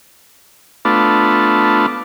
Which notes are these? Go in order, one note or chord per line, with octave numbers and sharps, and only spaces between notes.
A3 B3 D4 F4